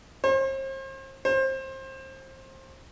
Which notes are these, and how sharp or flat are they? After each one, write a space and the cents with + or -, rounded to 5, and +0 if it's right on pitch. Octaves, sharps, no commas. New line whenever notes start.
C5 +40
C5 +25